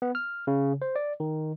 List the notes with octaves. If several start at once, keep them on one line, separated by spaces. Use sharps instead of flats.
B3
F6
C#3
C5
D5
D#3